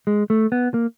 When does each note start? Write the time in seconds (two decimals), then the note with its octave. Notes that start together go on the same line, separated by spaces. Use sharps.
0.07 G#3
0.30 A3
0.52 B3
0.74 A#3